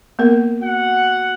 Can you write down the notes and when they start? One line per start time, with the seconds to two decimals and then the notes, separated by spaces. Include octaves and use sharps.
0.19 A#3 B3 A#4
0.61 F#4 F#5